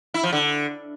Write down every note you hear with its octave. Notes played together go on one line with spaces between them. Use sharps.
E4
F3
D3